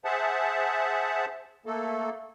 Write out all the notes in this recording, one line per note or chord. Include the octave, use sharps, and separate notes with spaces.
G#4 C5 E5 F#5 A5
A3 A#3 A4